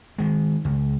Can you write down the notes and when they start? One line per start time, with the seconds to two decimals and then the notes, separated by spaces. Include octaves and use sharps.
0.18 D#3 G#3
0.65 C#2